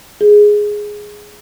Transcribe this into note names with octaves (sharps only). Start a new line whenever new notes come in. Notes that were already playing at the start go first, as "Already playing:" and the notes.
G#4